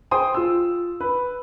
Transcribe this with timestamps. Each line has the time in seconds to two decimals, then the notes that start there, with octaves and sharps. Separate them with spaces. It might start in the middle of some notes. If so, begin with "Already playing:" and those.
0.11 G#4 C5 G5 G#5 C6 D#6
0.34 F4 E6
1.01 B4